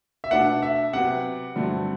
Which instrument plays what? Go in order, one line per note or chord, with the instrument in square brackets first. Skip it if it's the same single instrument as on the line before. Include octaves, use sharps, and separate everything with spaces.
[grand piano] E5
[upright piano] B2 A3 D4 [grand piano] F#5
[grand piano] E5
[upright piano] C3 F#3 B3 [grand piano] F#5
[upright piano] G2 D3 F#3 A3 C4